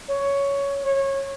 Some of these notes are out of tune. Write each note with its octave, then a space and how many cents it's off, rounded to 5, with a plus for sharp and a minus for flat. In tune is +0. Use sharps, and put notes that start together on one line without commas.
C#5 +10
C#5 -25